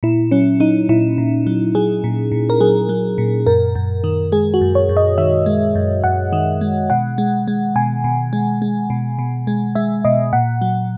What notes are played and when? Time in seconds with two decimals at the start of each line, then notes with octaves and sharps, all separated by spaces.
0.03 A#2 E4
0.31 F#3 C#4
0.60 F#3 D#4
0.89 A#2 E4
1.18 A#2
1.47 F#3
1.75 F#3 G#4
2.04 A#2
2.32 A#2
2.50 A#4
2.60 F#3 G#4
2.89 F#3
3.18 A#2
3.46 F#2 A#4
3.75 F#2
4.04 D#3
4.32 G#3 G#4
4.54 F#4
4.61 F#2
4.75 C#5
4.89 F#2
4.97 D#5
5.18 D#3 E5
5.46 G#3
5.75 F#2
6.04 F#2 F#5
6.33 D#3
6.61 G#3
6.90 B2 F#5
7.18 G#3
7.48 G#3
7.76 B2 G#5
8.04 B2
8.33 G#3
8.62 G#3
8.90 B2
9.19 B2
9.47 G#3
9.75 G#3 E5
10.05 B2 D#5
10.33 A#2 F#5
10.62 F#3